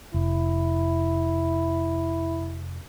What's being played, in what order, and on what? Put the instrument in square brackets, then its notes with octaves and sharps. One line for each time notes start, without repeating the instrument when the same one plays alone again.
[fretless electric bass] F1 [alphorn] E4